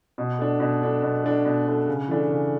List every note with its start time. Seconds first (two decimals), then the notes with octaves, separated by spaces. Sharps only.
0.18 B2
0.38 A3 D4
0.60 B2
0.81 A3 D4
1.03 B2
1.24 A3 D4
1.45 B2
1.67 A3 D4
1.87 C#3
2.08 E3 A3 D4
2.30 C#3